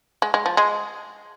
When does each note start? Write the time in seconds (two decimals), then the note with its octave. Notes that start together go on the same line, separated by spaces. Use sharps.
0.22 G#3
0.34 G#3
0.46 F3
0.57 G#3